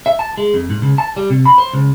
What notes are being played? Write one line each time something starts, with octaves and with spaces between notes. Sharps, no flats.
E5
A5
G#3
F2
G#2
C#2
A5
G3
C3
B5
C5
C#2